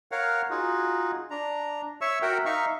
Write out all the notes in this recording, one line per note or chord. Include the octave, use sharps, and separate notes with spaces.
A#4 C#5 F5 F#5
D#4 F4 F#4 G#4
D4 A#5
C#5 E5 C#6 E6
F#4 A#4 E5 F#5 G5
D#4 E5 F5 C#6